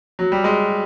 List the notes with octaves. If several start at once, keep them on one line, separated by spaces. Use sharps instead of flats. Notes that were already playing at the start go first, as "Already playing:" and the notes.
F#3
G3
G#3